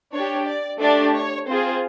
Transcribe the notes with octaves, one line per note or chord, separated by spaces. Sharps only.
D4 G4 C#5
D5
A3 D4 G4 D5
C#5
C4 F4 G#4 C5